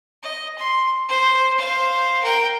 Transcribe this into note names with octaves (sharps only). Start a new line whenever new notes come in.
D#5
C6
C5
C5 F5
A#4 G5